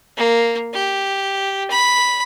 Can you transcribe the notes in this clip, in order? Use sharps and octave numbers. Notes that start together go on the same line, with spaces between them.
A#3
G4
B5